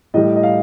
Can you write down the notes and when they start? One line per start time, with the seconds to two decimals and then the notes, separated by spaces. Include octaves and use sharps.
0.14 A2 G3 D#5
0.36 D#5
0.43 F5